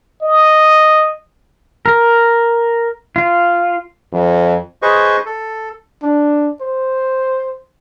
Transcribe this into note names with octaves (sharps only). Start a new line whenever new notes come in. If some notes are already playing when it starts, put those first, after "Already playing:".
D#5
A#4
F4
F2
G#4 B4 C5 D#5 C#6
A4
D4
C5